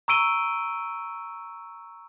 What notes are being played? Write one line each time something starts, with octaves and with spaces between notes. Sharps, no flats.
A#5 C#6 E6 D7 D#7 G7